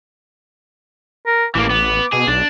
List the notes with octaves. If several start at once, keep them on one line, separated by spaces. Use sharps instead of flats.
A#4
A1 E3 A#3 D6
B3
B2 G#4
B1 D4